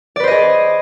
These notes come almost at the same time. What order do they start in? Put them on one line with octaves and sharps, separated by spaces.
D5 B4 C5 D#5 G#4